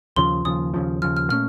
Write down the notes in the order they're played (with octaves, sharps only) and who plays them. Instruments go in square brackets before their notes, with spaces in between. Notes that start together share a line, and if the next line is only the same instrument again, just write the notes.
[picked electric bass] D#2 C#3 F3 [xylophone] C6
[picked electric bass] D#2 C#3 F3 [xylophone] D#6
[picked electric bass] D#2 C#3 F3
[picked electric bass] D#2 C#3 F3 [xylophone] F6
[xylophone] F6
[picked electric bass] A#2 A3 C#4 [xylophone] F6